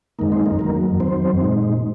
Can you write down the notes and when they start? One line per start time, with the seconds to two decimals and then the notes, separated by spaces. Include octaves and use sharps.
0.19 F#2 D#3 G#3 A#3 D#4 A#4
0.32 C4 C5
0.46 A#3 A#4
0.59 F#2 D#3 F#3 A#3 A#4
1.00 F#2 D#3 F#3 C4 C5
1.41 A#2 G#3 D#4